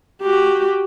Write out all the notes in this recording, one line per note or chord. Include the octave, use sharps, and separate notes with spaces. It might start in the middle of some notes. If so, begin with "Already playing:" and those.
F#4 G4